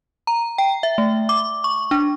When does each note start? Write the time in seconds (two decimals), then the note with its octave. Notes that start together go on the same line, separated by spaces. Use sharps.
0.27 A#5
0.58 G5
0.83 E5
0.98 A3
1.29 D6
1.64 C#6
1.91 D4